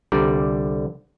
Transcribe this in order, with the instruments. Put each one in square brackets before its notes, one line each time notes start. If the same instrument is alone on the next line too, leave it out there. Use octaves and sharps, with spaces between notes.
[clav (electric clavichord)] C2 D3 G3 D5 A#5